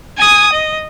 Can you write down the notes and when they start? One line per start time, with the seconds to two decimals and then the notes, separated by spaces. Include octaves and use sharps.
0.18 G#5 D#6
0.53 D#5